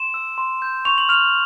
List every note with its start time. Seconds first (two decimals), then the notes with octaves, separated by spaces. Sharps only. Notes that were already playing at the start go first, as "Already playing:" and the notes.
Already playing: C6 E7
0.14 E6
0.38 C6
0.62 G6
0.85 C#6 F7
0.98 F#7
1.09 F6 F7